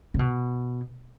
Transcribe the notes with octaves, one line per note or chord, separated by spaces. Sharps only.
C#3
B2